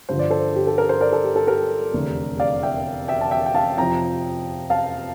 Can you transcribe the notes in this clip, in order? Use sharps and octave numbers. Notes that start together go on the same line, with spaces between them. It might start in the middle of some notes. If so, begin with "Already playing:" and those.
G2 D3 F3 C5
D5
A4 C5
G4
A4
A#4
C5
A#4 D5
A4
G4
A4
G4 A#4
F1 E2 D3 A3
D5 F5
E5 G5
E5 G5
A5
E5 G5
G5
F5 A5
F2 C3 F3 G5 A#5
F5 A5